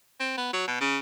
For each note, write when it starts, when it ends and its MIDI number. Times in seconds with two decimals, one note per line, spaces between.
0.20 0.32 60
0.37 0.48 59
0.53 0.66 54
0.67 0.76 47
0.80 0.98 49